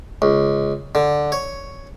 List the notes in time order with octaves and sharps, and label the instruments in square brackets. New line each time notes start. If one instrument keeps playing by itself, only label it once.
[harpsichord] C#2
D3
C#5